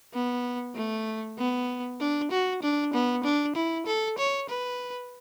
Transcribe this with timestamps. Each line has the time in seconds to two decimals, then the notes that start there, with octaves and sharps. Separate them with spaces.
0.14 B3
0.75 A3
1.38 B3
2.00 D4
2.31 F#4
2.62 D4
2.94 B3
3.24 D4
3.56 E4
3.86 A4
4.18 C#5
4.49 B4